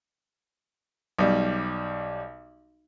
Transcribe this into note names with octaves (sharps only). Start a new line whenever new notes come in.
B1 G3